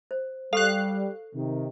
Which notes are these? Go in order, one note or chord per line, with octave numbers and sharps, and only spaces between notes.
C5
G3 A4 F5 C#6 F#6
C3 D#3